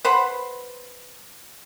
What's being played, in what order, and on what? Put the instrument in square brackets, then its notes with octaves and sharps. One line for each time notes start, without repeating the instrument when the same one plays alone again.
[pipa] B4 C5 F#5 B5